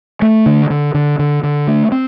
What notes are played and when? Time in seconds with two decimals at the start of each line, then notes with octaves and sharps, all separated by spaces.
0.22 A3
0.46 D3
0.70 D3
0.94 D3
1.19 D3
1.43 D3
1.67 A3
1.92 C4